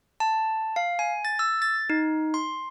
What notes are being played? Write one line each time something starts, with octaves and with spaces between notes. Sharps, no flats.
A5
F5
G#5
A6
E6
A6
D#4
C6